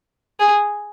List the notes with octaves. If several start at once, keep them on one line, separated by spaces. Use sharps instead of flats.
G#4